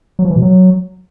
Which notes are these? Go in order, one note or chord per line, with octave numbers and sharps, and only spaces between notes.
F#3
F3
E3
B2
F#3